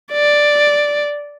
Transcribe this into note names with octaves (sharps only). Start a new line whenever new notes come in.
D5